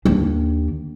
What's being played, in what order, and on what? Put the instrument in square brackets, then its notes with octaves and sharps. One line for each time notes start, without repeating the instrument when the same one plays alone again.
[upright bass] D#2 D4